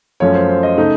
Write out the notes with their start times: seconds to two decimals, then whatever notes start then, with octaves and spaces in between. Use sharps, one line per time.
0.20 F#2 F3 A3 C#4 C#5
0.35 C5
0.49 C5
0.63 D#5
0.78 C#3 A3 D#4